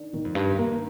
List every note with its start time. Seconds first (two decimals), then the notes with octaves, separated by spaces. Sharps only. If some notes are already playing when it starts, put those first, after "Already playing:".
Already playing: D#3 D4
0.13 A2 D#3
0.25 F2
0.35 G2
0.57 A2 A#3